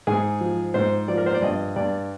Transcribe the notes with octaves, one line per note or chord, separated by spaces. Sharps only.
G#2 G#4
F3
G#2 C5
F3 D5
A#4
C5
D5
G2 D#5
G2 D5